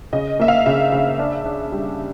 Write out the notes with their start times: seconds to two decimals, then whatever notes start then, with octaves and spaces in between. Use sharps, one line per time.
0.13 C#3 D#5
0.40 A#3 E5
0.48 F5
0.66 C#3 E5
0.92 C#3
1.19 D4
1.45 D4
1.72 G3